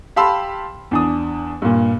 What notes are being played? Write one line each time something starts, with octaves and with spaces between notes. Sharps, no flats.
G4 F5 A5 B5 C6 E6
E2 D4 D#6
G2 A#2